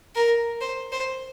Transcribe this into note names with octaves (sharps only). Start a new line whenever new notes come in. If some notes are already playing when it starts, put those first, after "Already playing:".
A#4
C5
C5